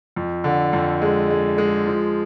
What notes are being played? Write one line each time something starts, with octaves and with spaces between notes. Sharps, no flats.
F2
D3
F2
G#3
G#3
G#3
F3